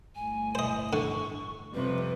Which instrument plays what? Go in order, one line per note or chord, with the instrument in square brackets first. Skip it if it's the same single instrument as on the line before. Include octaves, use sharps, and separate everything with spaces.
[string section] G1 A2 [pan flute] G#5
[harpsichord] C5 D#5
[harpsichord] D3 [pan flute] C#6
[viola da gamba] F2 C3 [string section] G3 [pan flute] B4